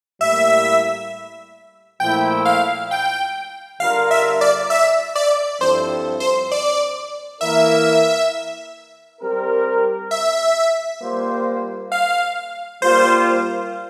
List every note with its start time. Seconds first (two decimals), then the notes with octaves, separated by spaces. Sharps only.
0.20 A2 G3 A#3 E4 E5
2.00 A#2 F3 A3 E4 G5
2.45 F5
2.91 G5
3.80 D3 G3 D4 F4 A#4 F5
4.11 E5
4.41 D5
4.70 E5
5.15 D5
5.61 G2 F3 C4 E4 A4 C5
6.20 C5
6.52 D5
7.41 E3 A#3 E4 A#4 E5
9.21 G3 C4 G4 A#4
10.11 E5
11.02 G3 A#3 F4 C5
11.92 F5
12.81 G3 A#3 F4 C5